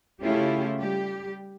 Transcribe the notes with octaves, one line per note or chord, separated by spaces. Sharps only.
C#3 A3 C#4 E4 F4 G4
G3 G4